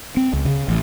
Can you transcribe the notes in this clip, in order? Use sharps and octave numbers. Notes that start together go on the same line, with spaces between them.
C4
C#2
C#3
A1